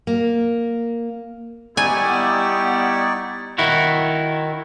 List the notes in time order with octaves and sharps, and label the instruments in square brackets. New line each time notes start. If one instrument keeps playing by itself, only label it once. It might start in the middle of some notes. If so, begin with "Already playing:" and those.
[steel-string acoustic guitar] A#3
[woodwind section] G3 B3 E4 [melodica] D#4 D5 C#6 [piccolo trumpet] G4 [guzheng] G#5
[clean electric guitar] D#3 E4 F#4